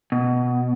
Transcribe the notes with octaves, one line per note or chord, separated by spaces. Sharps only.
B2